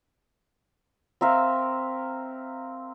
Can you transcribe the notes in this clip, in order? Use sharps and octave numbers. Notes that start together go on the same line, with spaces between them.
C4 A#4 E5 F5